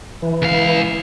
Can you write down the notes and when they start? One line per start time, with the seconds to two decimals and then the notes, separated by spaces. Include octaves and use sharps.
0.22 E3
0.42 C#2 F5